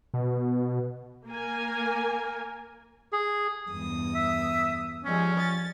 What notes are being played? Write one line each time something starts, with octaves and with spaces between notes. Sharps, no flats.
B2
A#3 A#4 G#5
G#4
E2 G2 D#6
E5
F3 G3 G#3 C#4
A6